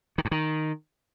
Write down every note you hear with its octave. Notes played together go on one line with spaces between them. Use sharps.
D#3
G2
D#3